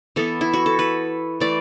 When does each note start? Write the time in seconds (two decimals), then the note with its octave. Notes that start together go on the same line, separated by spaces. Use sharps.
0.16 E3 B3 A4
0.41 E4
0.53 F#4
0.66 A4
0.79 B4
1.40 E3 A3 D5